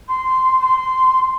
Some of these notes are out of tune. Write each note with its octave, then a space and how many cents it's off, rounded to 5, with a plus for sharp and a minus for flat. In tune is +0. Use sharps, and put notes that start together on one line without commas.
C6 -15
C6 -15